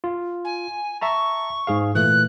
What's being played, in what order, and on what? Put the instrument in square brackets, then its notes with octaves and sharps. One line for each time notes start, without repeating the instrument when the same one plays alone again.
[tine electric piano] F4
[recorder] G#5
[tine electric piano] E5 A5 A#5 [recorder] C#6
[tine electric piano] G#2 G#4 F5
[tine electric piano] A#2 E3 A3 [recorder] F#6